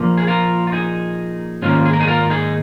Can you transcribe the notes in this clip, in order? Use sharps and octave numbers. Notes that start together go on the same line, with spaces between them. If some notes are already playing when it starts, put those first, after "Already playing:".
Already playing: A#2 F3 A#3
G#4
F4 A#4
F4
D#4 G#4
G#2 D#3 A#3 C#4 F4
G#4
A#4
D#4 G#4
F4 A#4
D#4 G#4